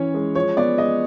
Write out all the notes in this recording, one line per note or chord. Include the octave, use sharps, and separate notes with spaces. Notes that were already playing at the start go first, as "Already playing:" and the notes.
Already playing: E3 C#4 C#5
G#3
F3 C#5
B3 D5
G#3 D#5